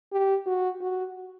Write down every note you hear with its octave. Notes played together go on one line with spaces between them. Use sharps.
G4
F#4
F#4